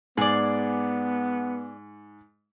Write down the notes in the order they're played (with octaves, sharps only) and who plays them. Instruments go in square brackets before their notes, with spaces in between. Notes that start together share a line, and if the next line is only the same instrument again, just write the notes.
[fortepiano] G#2 [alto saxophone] B3 [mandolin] G#4 D5